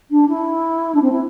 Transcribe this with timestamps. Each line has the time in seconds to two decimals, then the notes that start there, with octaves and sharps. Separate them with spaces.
0.11 D4
0.28 E4
0.94 D4
1.02 C4
1.12 E4